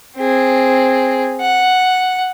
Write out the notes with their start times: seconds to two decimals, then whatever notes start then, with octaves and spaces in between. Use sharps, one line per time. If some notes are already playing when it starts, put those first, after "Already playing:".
0.18 C4 G#4
1.41 F#5